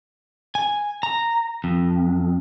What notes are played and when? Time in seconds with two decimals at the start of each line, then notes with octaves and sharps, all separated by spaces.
0.55 G#5
1.03 A#5
1.64 F2